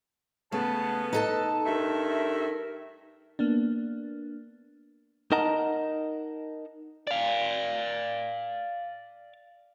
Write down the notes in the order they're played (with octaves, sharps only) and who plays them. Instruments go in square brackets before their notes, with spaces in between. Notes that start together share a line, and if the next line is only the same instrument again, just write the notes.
[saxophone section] C#3 B3 [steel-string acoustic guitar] A3 [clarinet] A5
[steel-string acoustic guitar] D#4 A4 A5 [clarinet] B4
[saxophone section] G2 A3 E5 [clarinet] A#4
[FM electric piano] A#3 B3 D4
[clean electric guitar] D#4 A#4 D#5 F#5 A5 A#5
[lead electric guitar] D5 F5